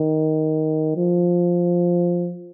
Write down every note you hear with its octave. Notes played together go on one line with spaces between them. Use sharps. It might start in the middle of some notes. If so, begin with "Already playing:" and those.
Already playing: D#3
F3